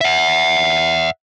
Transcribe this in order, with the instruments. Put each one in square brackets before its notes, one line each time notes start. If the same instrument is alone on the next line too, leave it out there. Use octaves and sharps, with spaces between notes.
[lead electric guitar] E5 F#5